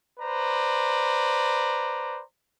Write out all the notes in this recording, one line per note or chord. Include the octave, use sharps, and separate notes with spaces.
B4 C5 D5 A#5